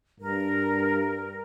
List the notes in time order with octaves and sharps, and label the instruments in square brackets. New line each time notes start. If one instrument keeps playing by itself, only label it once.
[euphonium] G2 [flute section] A#4